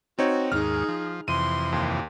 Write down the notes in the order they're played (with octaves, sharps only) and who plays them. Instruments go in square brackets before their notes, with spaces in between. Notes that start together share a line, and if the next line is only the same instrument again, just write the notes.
[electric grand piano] C4 D#4 C#5 [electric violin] F#4
[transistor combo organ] D#2 G#2 [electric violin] D#4 G#4 [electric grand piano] F6
[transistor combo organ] F3
[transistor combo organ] F2 C3 E3 [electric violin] C6 [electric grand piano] D#7
[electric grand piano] D#2